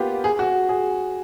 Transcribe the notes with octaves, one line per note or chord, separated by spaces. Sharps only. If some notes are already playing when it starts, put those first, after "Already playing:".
Already playing: A#3 B3 F4 G4
G#4
F#4
G#4